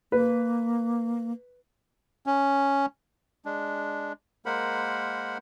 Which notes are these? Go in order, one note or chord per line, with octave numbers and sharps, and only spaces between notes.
A#3 B4
C#4
G#3 D4
G#3 A#3 A#4 C5 F#5 B5